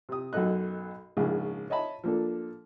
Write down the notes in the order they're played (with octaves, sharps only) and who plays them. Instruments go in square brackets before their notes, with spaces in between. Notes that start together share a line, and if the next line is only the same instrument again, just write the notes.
[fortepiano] C3 D#6
B1 F#2 B2 A4 D#5 F#6
A#1 G#2 C#3 G#4
C#5 D#5 E5 A5 B5
F3 A#3 D4 A4